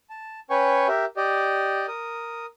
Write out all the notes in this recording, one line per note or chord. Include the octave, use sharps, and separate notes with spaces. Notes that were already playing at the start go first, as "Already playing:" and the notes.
A5
C#4 B4 C#5 G5 G#5 C#6
G4 A#4 E5
G4 D5 D#5
A#4 D#6